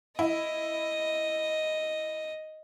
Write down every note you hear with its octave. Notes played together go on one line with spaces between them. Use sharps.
E4 D#5